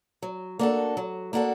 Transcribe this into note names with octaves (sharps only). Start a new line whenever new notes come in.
F#3
A#3 D4 F#4 A4
F#3
A#3 D4 F#4 A4